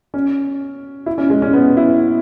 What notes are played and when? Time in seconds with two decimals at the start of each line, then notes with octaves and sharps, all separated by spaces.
0.14 C#4
1.06 E4
1.18 C#4
1.30 G#3
1.42 C#4
1.53 B3
1.77 E4